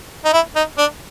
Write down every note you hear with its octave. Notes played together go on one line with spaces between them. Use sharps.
D#4
E4
D#4
D4